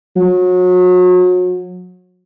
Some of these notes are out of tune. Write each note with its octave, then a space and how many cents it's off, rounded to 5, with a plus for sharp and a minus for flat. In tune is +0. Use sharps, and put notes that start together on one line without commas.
F#3 -30